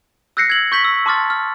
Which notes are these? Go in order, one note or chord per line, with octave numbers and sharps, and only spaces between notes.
E6 F#6 G6 A#6 C7 C#7
G#6 F#7
C#6 G6 B6 F#7
E6
A5 C6 D6 F6 A6
F6